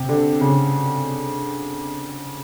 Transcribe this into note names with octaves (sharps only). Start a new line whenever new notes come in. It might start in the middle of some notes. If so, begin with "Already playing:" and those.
Already playing: C3
D3
C#3